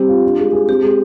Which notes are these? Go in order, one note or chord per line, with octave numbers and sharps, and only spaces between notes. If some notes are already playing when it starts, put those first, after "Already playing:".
Already playing: G3 C4 G4
F4
D4
G#3
G#4
C4 G4
G#3